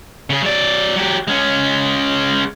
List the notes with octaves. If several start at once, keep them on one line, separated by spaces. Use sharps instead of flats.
C#3 G#4
F#3 D5
F#3 G4
G#3 C#4